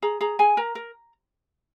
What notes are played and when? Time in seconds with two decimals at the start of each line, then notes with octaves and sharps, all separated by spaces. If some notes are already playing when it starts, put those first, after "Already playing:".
0.02 G#4 A#5
0.21 G#4 A#5
0.39 G#4 G#5
0.57 A#4 A#5
0.75 A#4